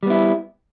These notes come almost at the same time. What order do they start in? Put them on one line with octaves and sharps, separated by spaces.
G3 B3 E4